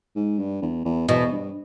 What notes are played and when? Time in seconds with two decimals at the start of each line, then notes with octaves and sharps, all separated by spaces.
0.16 G#2
0.39 G2
0.62 E2
0.85 E2
1.08 E2 B2
1.32 G2